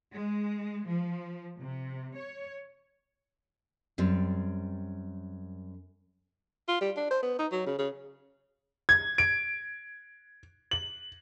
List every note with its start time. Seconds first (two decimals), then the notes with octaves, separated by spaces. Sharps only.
0.13 G#3
0.87 F3
1.57 C3
2.15 C#5
3.98 F#2 G3 C4
6.68 F4
6.81 G3
6.97 D4
7.11 C5
7.23 B3
7.39 D#4
7.52 F#3
7.67 C#3
7.79 C#3
8.89 G#6
9.18 D7
10.71 F#7